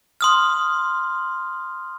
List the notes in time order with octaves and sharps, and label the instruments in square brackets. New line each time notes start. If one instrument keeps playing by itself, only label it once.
[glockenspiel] C6 D#6 F6